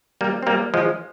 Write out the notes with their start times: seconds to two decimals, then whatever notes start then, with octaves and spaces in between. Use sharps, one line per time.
0.21 G3 A#3
0.43 C4
0.47 G3 A#3
0.74 F3 G#3